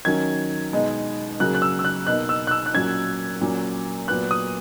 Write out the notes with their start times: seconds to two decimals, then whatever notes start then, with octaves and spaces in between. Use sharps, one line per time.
0.05 D#3 F#3 C#4 G#6
0.73 B2 G#3 D#4
1.40 C#3 F#3 A#3 F#6
1.55 F#6
1.62 E6
1.79 E6
1.84 F#6
2.07 B2 A#3 D#4 F#6
2.29 E6
2.47 F#6
2.51 E6
2.66 F#6
2.74 A#2 F#3 C#4 G#6
3.41 A#2 F#3 C#4
4.08 A#2 F#3 B3 F#6
4.31 D#6